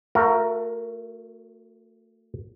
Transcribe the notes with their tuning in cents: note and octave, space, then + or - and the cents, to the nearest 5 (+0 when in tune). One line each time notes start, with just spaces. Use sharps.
A3 +30 F#4 -35 A#4 +0